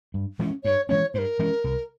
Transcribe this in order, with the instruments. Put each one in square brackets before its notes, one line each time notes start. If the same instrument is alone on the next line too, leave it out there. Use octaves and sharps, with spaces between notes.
[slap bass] G2
E3 G#3 C#4
[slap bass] G2 [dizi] C#5
[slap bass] E3 G#3 C#4 [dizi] C#5
[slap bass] G2 [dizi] A#4 C5
[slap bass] E3 G#3 C#4
C2